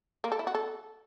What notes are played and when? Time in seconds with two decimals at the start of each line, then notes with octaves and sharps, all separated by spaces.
0.24 A#3
0.32 A4
0.39 E4
0.47 F#4
0.55 A4